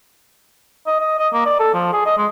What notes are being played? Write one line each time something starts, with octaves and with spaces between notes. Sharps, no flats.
D#5
D#5
D#5
A#3
D5
A4
F3
G#4
D#5
G#3